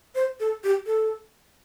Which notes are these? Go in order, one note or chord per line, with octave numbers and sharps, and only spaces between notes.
C5
A4
G4
A4